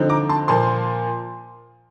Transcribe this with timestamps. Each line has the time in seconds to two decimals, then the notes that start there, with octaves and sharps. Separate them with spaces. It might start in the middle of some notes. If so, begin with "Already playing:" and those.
Already playing: D3 F3 C4 D#4
0.09 A#5 D6
0.29 A5 C6
0.48 A#2 F3 A#3 A5 C6